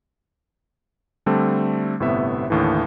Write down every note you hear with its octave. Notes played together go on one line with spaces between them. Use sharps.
D3 G3 A3 C4
G1 A2 C3 B3 E5
D#2 A2 D3 E3